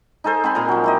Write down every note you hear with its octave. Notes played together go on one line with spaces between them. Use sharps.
D#4 G#4 A4 C5
C4 G#5 B5 C6
A#2 G#4 A#5
F3 F#3
E4 G4 D#5